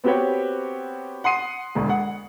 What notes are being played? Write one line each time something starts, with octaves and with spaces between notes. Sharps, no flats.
B3 C4 F#4 G4 B4 C#5
F#5 C6 D#6 C7 D#7
E1 D2
F#5